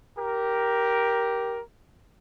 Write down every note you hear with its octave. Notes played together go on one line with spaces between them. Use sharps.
G4 A#4